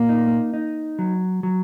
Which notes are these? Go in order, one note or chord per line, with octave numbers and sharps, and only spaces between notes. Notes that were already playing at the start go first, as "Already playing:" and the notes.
Already playing: A#2 A#3
D#4
D#4
F#3
F#3